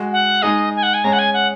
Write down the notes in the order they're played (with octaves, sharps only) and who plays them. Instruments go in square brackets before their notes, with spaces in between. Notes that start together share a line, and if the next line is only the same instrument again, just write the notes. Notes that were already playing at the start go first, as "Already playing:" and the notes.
Already playing: [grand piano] G#3 F#4
[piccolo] F#5
[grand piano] G#3 D#4 G#4 [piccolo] D#5
[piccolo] G#5
F#5
G#5
[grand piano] G#3 C#4 G#4 [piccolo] A#5
[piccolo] F#5
G#5
F#5